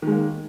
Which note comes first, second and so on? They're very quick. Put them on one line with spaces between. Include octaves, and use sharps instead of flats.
D#3 G#3 A#3